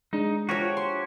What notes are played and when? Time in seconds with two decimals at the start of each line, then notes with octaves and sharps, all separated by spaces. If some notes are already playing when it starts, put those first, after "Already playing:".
0.13 G#3 D4 D#4
0.49 F3 F#4 G4 A#4 C#5
0.77 C6